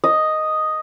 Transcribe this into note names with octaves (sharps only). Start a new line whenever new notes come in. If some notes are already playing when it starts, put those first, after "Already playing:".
D#5